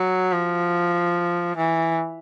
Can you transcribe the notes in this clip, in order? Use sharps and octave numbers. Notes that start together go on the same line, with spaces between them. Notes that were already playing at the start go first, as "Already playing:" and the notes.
Already playing: F#3
F3
E3